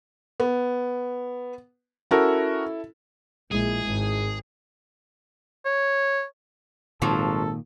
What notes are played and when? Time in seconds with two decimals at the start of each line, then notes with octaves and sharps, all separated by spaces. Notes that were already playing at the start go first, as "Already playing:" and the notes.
0.40 B3
2.11 C#4 E4 F#4 A4 A#4
3.51 A#1 G#3 E4 G#4
3.86 G#1
5.65 C#5
7.02 G#1 A#2 D#3 F3 F#3 A4